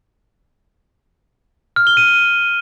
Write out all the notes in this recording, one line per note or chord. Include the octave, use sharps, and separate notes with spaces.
F6
G7
D#7